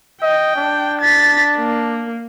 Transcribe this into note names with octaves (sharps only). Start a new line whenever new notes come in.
D#5 G5
D4
A6 B6
A#3